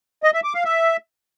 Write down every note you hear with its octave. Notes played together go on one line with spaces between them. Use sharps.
D#5
E5
D6
F5
E5